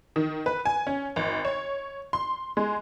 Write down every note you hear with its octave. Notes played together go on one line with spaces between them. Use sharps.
D#3
B4
G#5
C#4
G#1
C#5
C6
G#3